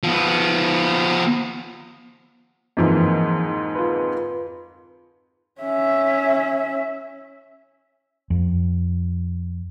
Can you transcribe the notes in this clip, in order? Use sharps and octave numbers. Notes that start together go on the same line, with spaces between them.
F3 B3
F2 G#2 E3 F3 A#3 D#4
F4 B4
C#4 E5
F2